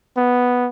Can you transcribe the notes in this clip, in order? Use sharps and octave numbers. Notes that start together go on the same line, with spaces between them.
B3